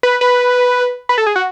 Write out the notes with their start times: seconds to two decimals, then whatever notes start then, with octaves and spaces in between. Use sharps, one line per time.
0.03 B4
0.21 B4
1.09 B4
1.18 A4
1.27 G#4
1.36 F#4